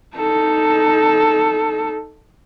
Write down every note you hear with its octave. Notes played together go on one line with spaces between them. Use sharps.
D#4 A4